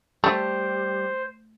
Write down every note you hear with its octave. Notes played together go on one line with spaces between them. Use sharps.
G3 A3 G4 C5